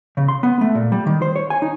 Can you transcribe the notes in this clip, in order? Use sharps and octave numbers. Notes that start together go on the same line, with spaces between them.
C#3
C6
B3
A3
A#2
G3
D#3
C5
C#5
G#5
D#4